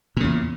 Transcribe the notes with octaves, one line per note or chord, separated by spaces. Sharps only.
E2 A#2 C#3